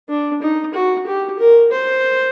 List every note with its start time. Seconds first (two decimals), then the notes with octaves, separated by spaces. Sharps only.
0.09 D4
0.42 D#4
0.75 F#4
1.06 G4
1.39 A#4
1.72 C5